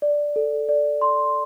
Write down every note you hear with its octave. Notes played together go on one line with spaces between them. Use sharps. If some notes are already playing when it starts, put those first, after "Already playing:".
D5
A4
D5
C6